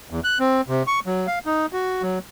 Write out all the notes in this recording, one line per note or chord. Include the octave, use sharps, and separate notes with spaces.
E2
F#6
C4
C3
C#6
F#3
F5
D#4
F#4
F#3